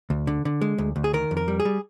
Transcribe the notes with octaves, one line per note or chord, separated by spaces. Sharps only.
D2
D3
D3
G#3
D2
D2
G#4
D#3 A#4
F2
A#4
G3
G#4
G3